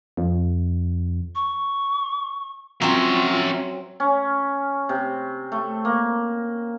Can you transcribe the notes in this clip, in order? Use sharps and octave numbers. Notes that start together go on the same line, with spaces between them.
F2
C#6
F#3 C4 C#4 F4 E5
C#4
C3
A3
A#3